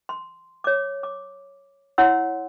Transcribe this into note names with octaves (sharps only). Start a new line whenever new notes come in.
C6
C#5 D6
D6
E4 C#5 F#5 C6 E6